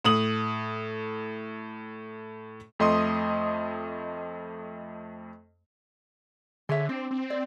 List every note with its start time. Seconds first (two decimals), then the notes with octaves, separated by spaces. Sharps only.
0.05 A2 D#6 F#7
2.79 F2 A3 D#5 C6 D#6
6.69 D3 G#4 C#5 E5
6.89 C4 D4
7.11 C4
7.30 D5